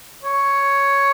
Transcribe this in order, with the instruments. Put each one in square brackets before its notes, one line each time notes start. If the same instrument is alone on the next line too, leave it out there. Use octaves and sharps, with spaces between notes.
[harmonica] C#5